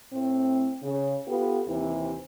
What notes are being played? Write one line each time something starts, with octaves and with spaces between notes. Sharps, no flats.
A2 C4
C#3
B3 F4 G4 A4 B4
D#2 C3 E3 C4